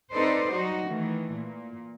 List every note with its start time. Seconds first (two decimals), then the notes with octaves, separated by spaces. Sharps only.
0.14 C4 D#4 A4 B4 C5 D5
0.53 F#3 G3 D#4 F#4
0.87 D#3 E3 A3
1.35 A#2